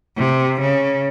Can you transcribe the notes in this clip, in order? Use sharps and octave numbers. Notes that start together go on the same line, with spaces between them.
C3
C#3